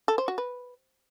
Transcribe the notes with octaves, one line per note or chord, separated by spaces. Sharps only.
A4
C5
F#4
B4